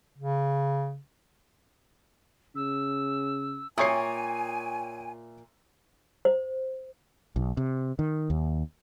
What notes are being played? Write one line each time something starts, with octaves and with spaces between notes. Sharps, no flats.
C#3
C#3 E6
A#2 C#5 E5 G5 G#5 C#6 D#6 C7
C5
B1
C3
D#3
D#2